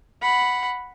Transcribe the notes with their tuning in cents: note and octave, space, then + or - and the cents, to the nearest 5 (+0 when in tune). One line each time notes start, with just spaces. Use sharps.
F#5 -5 B5 +0